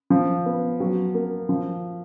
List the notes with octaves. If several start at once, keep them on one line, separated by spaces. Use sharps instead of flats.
F3
B3
F#3
A#3
F3